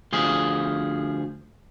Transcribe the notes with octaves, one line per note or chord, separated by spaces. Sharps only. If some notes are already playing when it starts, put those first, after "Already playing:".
D2 F3 G#4